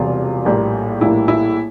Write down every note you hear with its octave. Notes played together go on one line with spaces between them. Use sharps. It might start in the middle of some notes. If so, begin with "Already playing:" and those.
Already playing: E1 E2 C3 G3 F4
A#1 A2 G3 A#3
A#1 A2 G3 A#3 E4
E4